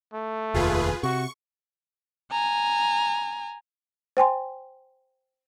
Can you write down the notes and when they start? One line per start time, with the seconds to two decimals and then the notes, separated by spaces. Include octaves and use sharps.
0.13 A3
0.54 F1 D#2 F4 G#4 B4
1.03 C3 F#4 C#6
2.31 G#5 A#5
4.17 C5 G5 G#5 C6